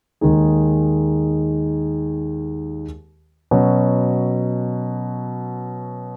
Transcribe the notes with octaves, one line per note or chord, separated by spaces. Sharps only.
D#2 D#3 G#3 D#4 G#4
B2 F#3 C#4